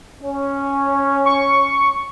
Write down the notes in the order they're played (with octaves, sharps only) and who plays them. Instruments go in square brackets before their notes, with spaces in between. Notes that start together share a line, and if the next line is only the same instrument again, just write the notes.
[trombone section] C#4
[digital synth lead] C#6